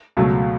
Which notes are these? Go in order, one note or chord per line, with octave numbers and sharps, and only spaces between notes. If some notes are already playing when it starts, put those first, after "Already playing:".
C#2 B2 F#3 A3